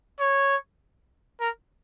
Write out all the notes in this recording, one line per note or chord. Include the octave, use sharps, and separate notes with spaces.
C#5
A#4